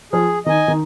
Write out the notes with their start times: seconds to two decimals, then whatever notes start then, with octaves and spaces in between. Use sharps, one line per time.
0.12 F3 G#4
0.46 D#3 D#5 G#5
0.68 D#3